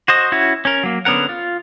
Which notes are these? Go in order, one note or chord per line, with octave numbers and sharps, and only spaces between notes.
F#4 C5 D#5
C#4 E4 F#4
C#4 A#4
F#3 A#3
D3 B3 C#4 A#4 F#5
F4